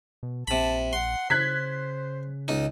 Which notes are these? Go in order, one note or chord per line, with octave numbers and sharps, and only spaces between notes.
B2
A#1 C3 A5 B5
F#5 C6
C#3 C5 F#6 G#6 B6
C#2 D#4